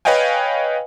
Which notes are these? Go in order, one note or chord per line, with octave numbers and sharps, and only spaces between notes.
B4 C#5 D#5 F5 G5 G#5